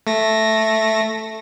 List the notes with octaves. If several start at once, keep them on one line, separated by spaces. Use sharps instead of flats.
A3 A#6